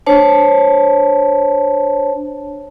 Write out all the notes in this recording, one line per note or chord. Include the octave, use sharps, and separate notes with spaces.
D4 C5 C#5 A5